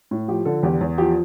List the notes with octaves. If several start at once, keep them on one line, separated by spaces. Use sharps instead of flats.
A2
F3 G4
D3 A4
E2 G4
E2
F3 G4